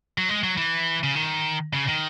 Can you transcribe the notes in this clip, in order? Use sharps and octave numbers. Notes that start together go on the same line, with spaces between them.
F#3
G#3
F#3
E3
C#3
D#3
C#3
D#3